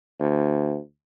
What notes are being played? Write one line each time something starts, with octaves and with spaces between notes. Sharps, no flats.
D2